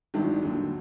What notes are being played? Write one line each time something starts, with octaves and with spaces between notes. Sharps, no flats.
G#1 G2 D#3 F#3 E4
D#2 D3 F#3